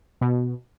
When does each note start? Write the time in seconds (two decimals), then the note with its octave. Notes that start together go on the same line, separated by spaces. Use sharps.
0.21 B2